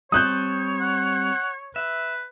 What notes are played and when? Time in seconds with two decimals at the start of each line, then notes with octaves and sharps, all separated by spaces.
0.12 G3 C4 C#5 A5 D#6 F#6 G6
0.81 F#5
1.76 B4 E5